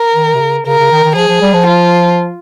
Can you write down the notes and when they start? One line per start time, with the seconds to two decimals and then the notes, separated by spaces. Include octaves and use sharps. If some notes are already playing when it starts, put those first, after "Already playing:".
Already playing: A#4
0.15 D#3
0.35 C3
0.41 C#3
0.66 C#3 A#4
0.79 C#3
0.91 D#3
1.04 D#3
1.16 F3 G#4
1.28 F3
1.41 G3
1.54 F3
1.67 F4